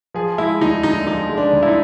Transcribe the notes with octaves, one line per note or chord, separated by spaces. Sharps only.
F3 G#4
G#3 E4
D2 D#4
D3 D#4
F3 D#4
G#3
D4
D2
E4
D#4